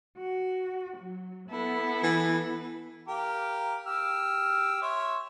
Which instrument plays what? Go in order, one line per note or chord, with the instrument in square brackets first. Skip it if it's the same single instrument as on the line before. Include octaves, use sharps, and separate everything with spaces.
[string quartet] F#4
F#3
B3 E4 A4
[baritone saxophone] E3
[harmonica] G4 A#4 F5
G4 E6 F6
C#5 E5 C6